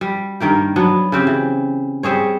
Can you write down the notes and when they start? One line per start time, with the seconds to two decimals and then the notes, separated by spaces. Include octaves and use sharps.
0.01 G3
0.40 G2 D#3 A#3 G4
0.76 F#3 B3 D4
1.12 C#3 C4 G4
1.27 E3
2.03 G3 C4 G#4 C#5